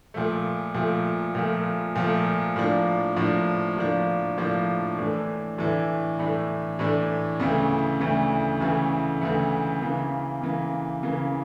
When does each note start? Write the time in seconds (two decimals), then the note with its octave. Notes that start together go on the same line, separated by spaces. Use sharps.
0.14 A#2 F3 A3
0.74 A#2 F3 A3
1.35 A#2 F3 A3
1.96 A#2 F3 A3
2.56 A2 F3 A#3 D4
3.17 A2 F3 A#3 D4
3.77 A2 F3 A#3 D4
4.38 A2 F3 A#3 D4
4.98 A2 E3 A3 D4
5.58 A2 E3 A3 D4
6.19 A2 E3 A3 D4
6.79 A2 E3 A3 D4
7.40 D2 C#3 E3 A3
8.00 D2 C#3 E3 A3
8.61 D2 C#3 E3 A3
9.21 D2 C#3 E3 A3
9.81 C#3 E3 A#3
10.42 C#3 E3 A#3
11.03 C#3 E3 A#3